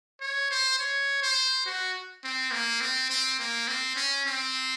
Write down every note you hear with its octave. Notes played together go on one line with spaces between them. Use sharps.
C#5
C5
C#5
C5
F#4
C4
A#3
C4
C4
A#3
C4
C#4
C4